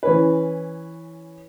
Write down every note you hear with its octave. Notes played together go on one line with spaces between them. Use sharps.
E3 C#4 B4